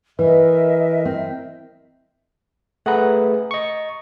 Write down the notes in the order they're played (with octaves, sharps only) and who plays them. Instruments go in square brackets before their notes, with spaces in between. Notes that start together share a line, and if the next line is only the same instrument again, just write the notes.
[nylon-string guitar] E3 [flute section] A#4 D#5 E5 [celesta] B4
[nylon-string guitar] C4
[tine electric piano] A3 G#4 B4 [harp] F#5 A#5
[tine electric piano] D#5 C#6